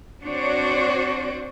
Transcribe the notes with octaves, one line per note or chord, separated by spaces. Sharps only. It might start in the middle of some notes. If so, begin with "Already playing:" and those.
C4 D4 F#4 C5 C#5